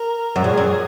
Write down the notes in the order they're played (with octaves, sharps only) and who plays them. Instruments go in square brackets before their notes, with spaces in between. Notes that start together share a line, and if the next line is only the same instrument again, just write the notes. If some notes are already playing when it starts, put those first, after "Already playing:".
Already playing: [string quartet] A#4
[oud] F#2
[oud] F2 [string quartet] G#4
[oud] F#2